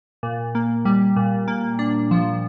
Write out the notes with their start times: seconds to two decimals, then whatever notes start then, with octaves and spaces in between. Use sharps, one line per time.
0.23 A#2
0.55 A#3
0.85 G3
1.16 A#2
1.48 A#3
1.79 D4
2.11 F3